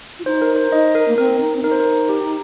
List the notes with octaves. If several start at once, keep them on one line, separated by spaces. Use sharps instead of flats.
F4
D#4 C5
A#4
C5
D#4 D#5
A#4
A#3
C4 A#4
D#4
C4
D#4 A#4
C5
A#4
G4
G4